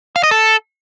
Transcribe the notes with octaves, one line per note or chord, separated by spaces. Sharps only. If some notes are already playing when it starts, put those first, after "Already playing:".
F5
D#5
A4